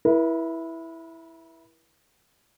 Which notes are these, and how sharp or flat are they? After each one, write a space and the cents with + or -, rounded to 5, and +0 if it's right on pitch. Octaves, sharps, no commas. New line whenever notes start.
E4 +0 B4 -45